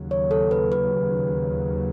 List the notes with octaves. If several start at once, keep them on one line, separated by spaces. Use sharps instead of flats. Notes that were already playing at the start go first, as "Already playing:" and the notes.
Already playing: D#2 C#3 F#3
C#5
A4
B4
B4